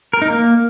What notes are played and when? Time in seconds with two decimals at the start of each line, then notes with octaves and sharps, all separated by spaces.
0.13 A#4
0.22 D#4
0.30 A#3